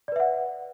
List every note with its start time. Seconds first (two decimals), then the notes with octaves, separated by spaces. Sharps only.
0.08 D5
0.12 B4
0.16 E5
0.20 F#5